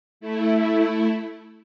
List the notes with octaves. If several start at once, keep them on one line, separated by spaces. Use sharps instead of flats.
A3 E4